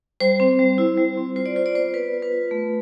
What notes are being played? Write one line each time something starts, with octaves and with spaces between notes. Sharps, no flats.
G3 C5
C4
G3
E4
G3
C4
F4 C5
D5
F4 C5
D5
B3 C5
B3 B4
F4
B4
F4
A3